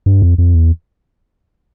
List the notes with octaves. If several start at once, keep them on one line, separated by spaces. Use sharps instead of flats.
G2
F2
F2
E2